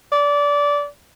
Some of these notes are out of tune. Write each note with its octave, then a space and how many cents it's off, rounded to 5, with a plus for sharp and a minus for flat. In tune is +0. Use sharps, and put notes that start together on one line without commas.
D5 -20